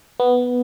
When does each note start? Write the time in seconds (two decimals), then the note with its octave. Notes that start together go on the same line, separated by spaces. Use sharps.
0.20 B3